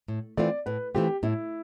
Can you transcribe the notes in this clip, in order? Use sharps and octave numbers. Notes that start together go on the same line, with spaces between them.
A2
E3 A3 C4 F4 D5
A2 B4
E3 A3 C4 F4 G4
A2 E4